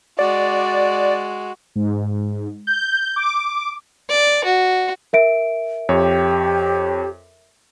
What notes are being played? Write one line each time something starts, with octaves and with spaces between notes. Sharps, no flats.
G#3 F#4 D5
G#2
G6
D6
D5
F#4
A#4 E5 D7
F2 G4 C#5